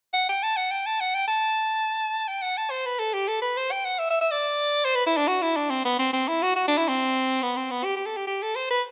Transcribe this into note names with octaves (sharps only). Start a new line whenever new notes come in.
F#5
G5
A5
F#5
G5
A5
F#5
G5
A5
G5
F#5
A5
C5
B4
A4
G4
A4
B4
C5
G5
F#5
E5
E5
E5
D5
C5
B4
E4
D4
F#4
E4
D4
C4
B3
C4
C4
E4
F#4
F#4
D4
E4
C4
B3
C4
B3
G4
G4
A4
G4
G4
A4
C5
B4